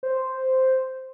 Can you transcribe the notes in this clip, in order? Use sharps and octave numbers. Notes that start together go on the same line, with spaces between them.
C5